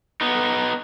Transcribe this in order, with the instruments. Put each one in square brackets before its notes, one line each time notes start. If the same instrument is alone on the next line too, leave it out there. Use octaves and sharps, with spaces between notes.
[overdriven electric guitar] B3 D#4